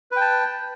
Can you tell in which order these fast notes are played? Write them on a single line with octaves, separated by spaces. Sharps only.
B4 G5 A5